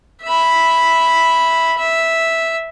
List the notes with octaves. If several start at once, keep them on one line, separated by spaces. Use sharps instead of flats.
E5 B5
E5